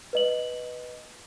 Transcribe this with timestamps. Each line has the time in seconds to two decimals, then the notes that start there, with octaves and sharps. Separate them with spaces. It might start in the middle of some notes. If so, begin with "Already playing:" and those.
0.13 B4 D#5 F#7